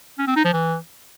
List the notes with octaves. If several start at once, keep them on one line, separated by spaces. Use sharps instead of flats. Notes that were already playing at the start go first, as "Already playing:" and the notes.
C#4
C4
D#4
F3
E3